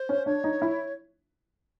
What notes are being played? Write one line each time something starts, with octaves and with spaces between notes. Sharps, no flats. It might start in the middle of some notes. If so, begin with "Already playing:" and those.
Already playing: C5
C#4
D4 C#5
D#4
E4